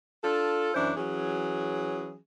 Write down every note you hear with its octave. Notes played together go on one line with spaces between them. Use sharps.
D4 F4 A4
F#2 E3 D4 C5
E3 F#3 C#4 G#4